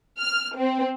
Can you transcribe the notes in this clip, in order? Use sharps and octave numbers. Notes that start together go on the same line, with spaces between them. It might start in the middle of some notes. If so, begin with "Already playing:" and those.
F6
C4